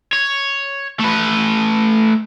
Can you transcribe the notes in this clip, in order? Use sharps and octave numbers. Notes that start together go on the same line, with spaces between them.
C#5
A3 B4